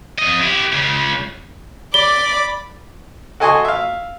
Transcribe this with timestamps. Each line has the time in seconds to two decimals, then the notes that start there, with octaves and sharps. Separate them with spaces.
0.18 F2 D#5
0.41 E4 G4
0.72 C#2 C#3
1.94 D5 B5 D6 G7
3.40 F#4 A4 D#5 G#5 C6 C#6
3.65 E5 F5